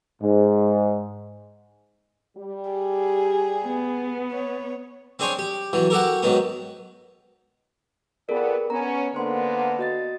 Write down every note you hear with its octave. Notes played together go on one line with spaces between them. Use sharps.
G#2
G3 G4
G#4
B3
C#5
C4 D4 G#4 C5 C#5
G4
E2 E3 F#3
F#4 G4 A4 A#4
G#2 D#3 F#3 B3
F2 B3 G#4 A#4 D5
B3 C#4 A#5
D3 A#3 B3 C5 C6
F#4 D#5 A6